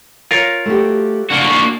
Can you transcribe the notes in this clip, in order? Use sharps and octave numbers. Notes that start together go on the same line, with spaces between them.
F4 A#4 C#5
A3 F#4 G4
A#3 D4 F#4